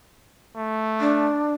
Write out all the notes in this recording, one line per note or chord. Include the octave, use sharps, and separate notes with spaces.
A3
D4